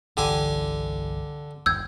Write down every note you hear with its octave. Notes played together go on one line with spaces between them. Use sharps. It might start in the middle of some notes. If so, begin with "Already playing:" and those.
G1 C2 D3 E3 G4 G#5
G1 D#2 E6 G6 G#6